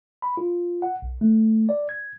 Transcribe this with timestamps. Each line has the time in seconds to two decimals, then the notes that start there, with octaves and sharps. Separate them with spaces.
0.22 B5
0.37 F4
0.82 F#5
1.02 B1
1.21 A3
1.69 D5
1.89 G#6